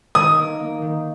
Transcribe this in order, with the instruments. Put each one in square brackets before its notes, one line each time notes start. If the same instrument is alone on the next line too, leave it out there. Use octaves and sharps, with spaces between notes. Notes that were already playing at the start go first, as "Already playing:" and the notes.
[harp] D#3 [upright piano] D#6
[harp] A#3
A#3
D#3